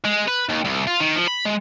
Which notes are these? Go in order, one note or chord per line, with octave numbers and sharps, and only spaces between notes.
G#3
B4
D#2
C2
F4
D#3
F3
B5
G#3